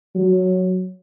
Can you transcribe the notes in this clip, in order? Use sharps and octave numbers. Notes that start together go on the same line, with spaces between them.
F#3